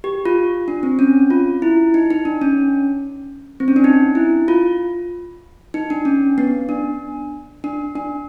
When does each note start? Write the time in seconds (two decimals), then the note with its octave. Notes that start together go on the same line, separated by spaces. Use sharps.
0.04 G4
0.25 F4
0.68 D4
0.83 C4
0.99 C#4
1.30 F4
1.62 E4
1.94 D#4
2.10 D#4
2.25 D4
2.42 C#4
3.60 C4
3.68 C#4
3.76 D4
3.84 D#4
4.15 E4
4.48 F4
5.74 D#4
5.90 D4
6.05 C#4
6.38 B3
6.69 D4
7.64 D4
7.95 D4